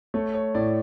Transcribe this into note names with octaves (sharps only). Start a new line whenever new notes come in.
A3 C#5
C#5
A2 D5